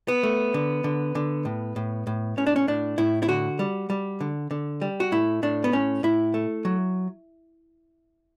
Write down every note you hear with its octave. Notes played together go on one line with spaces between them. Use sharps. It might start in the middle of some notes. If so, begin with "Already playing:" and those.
B3
A3
D3
D3
D3
A2
A2
A2
A2 C#4
D4
C#4
A2 D4
A2 E4
E4
D3 F#4
G3
G3
D3
D3
G3
F#4
A2 E4
A2 D4
B3
A2 C#4
A2 E4
A3
F#3